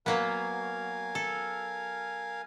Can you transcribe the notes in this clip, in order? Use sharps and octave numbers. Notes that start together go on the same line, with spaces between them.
F#3 A#3 B3 A#4 F5 G#5
A4